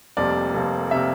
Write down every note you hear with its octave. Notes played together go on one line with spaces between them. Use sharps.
F1 F2 C3 G3 A#3 D5
F1 F2 C3 G3 A#3
C3 G3 A#3 E5